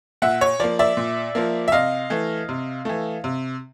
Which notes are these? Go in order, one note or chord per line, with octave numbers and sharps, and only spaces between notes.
A#2 E5 F#5
C#5
F3 A#3 D5
D5 E5
A#2
F3 A#3
E5
C3 D#5 F5
E3 A3
C3
E3 A3
C3